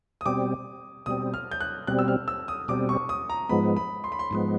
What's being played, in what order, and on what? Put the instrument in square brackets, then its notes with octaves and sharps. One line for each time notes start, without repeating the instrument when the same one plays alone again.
[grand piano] D#6
[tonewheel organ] B2 G3 C4 [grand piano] D6
[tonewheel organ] B2 G3 C4 [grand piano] D#6
[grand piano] F6
G6
F#6
[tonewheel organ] B2 G3 C4 [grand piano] F#6
[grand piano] E6
F6
E6
D#6
[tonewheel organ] B2 G3 C4 [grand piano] D6
[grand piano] C#6
D#6
A#5
[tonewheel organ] G#2 F3 G#3 B3 [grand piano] B5
[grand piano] B5
C6
B5
C6
[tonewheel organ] G#2 F3 G#3 B3